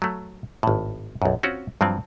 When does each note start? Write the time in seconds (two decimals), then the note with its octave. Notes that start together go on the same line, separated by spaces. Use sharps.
0.02 F#3 A3
0.63 G#1 A2
1.22 B1 F#2
1.43 C4 C#4 F4 F#4
1.81 G2 F3 F#3 C4